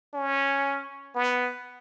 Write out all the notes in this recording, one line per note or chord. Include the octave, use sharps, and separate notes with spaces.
C#4
B3